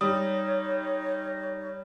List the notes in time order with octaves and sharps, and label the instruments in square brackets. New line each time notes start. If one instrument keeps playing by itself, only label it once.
[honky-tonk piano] G3 [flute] D#4 [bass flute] C#5 [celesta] D#6